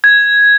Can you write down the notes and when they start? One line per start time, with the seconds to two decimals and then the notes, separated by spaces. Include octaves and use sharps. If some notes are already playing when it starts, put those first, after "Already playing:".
0.04 G#6